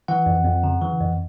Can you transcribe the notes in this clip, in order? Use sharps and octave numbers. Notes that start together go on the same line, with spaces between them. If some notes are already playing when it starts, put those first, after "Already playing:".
E3 F#5
F2
F2
C#3
E3
F2